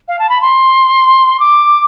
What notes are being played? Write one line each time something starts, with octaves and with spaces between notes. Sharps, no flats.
F5
A5
B5
C6
D6